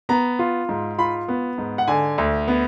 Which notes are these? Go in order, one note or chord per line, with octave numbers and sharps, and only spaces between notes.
B3 A#5
F4
G#2
F4 B5
B3
G#2
F#5
D3 G#5
D2
B3